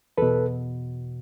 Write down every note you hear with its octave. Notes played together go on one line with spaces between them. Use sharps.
E2 B2 A4 B4